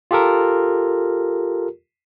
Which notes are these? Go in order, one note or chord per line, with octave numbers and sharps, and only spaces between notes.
F4 G4 A4 A#4